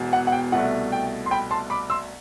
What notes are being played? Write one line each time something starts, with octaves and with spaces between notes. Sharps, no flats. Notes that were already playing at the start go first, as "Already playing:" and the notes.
Already playing: E1 E2
F#5
F#5
G5
C2 B2 A3 F#5
G5
C6
G5 B5
A5 C6
B5 D6
C6 E6